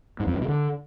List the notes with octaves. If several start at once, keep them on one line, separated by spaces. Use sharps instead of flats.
G#2
F2
G2
B2
D3